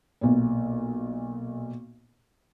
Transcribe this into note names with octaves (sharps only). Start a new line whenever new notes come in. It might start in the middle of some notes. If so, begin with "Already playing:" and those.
B1 A#2